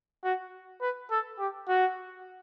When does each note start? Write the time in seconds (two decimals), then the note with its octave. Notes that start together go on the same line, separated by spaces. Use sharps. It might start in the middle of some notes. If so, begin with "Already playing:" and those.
0.24 F#4
0.81 B4
1.11 A4
1.39 G4
1.68 F#4